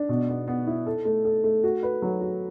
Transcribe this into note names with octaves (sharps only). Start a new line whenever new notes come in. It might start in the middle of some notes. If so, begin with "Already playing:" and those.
Already playing: D4
B2
B3
B3
E4
A4
A3
A4
A3
F#4
B4
F#3
F#4